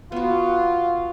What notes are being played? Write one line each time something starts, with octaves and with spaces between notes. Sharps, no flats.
B3 F4 F#4